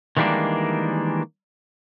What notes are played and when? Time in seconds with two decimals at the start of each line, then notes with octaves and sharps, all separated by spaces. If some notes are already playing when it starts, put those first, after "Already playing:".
0.17 D#3 E3 G3 G#3 A#3 D4